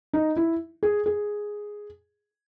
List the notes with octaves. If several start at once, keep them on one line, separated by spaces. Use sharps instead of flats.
D#4
E4
G#4
G#4